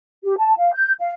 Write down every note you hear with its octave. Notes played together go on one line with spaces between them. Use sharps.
G4
A5
F5
G6
F5